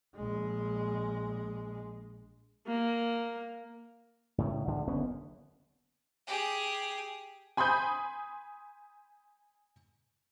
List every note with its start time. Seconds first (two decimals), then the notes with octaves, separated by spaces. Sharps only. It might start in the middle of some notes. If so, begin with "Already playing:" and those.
0.16 A#1 G#3
2.67 A#3
4.38 C#2 A2 C#3
4.67 D2 D3 G#3
4.88 F#1 D3 B3 C#4
6.28 G4 G#4
7.57 G#5 B5 C6 D#6 G6